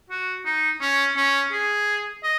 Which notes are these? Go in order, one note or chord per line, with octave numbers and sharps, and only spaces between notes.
F#4
D#4
C#4
C#4
G#4
D#5